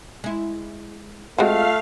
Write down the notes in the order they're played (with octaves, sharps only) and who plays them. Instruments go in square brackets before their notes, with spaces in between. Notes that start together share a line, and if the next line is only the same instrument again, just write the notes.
[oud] G#3 E4
[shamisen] G#3 C4 F#4 [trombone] A3 [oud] F4 [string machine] F5